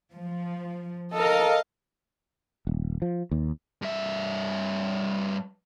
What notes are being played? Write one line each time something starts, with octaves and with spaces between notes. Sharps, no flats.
F3
A4 A#4 D#5 F5
D#1
F3
D#2
G2 E5